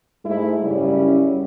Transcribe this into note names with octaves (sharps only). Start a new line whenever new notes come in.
G#2 G#3 A3 E4
F#2 C#3 G3 C#4 E4 D5